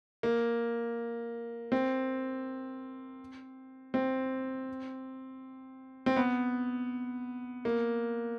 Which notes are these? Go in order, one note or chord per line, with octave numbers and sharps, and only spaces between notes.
A#3
C4
C4
C4
B3
A#3